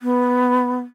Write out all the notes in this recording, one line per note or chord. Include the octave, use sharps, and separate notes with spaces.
B3